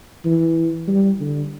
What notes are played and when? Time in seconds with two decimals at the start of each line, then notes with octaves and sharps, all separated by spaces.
0.25 E3
0.87 G3
1.20 D3